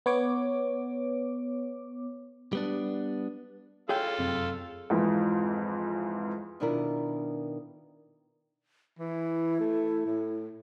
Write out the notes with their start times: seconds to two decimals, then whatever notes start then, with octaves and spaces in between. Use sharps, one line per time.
0.06 B3 C#5 D6
2.53 G3 B3 D4
3.89 F4 G#4 A4 C#5 F5 G5
4.19 F1 F#2 C4
4.90 F2 G#2 E3 F3
6.60 B2 D#3 D4 E4 F4 A#4
8.99 E3 E4
9.60 A3
10.06 A2